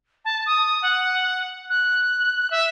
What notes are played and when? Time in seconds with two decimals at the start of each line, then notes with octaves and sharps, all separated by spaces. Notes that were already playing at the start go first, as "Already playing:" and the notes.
0.25 A5
0.46 D#6
0.82 F#5
1.70 F#6
2.51 E5